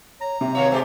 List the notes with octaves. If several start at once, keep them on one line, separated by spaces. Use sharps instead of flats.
C#5 A#5
C3 E5
D#3 F#3 C#5 F5
G#2 G#3 G4 C5